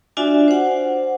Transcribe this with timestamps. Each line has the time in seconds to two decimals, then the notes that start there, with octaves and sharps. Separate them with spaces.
0.17 D4 F4 F#4 D5 E5 G#5
0.48 C5 F#5